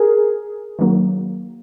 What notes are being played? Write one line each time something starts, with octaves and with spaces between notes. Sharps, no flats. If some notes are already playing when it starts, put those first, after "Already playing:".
Already playing: G#4 A#4
D#3 F#3 A#3